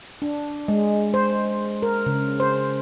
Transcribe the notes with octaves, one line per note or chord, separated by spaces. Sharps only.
D4
G#3
C5
A#4
C#3
C5